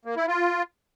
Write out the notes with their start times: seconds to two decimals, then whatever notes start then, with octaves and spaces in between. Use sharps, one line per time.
0.05 A#3
0.16 E4
0.27 F4